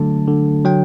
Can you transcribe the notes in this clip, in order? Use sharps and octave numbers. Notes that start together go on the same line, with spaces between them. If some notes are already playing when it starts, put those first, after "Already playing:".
Already playing: D3 F#3 A3 A5
D3
F#3 G5